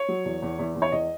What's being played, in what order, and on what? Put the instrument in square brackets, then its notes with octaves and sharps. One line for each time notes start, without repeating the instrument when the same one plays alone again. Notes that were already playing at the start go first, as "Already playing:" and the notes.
Already playing: [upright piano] C#5
F#3
E2
E2
E2
E2
C#5
E2 D#5